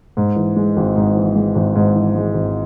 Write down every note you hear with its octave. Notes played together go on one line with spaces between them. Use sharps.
G#2
E3
G#3
G#1
G#2
E3
G#3
G#1
G#2
E3
G#3
G#1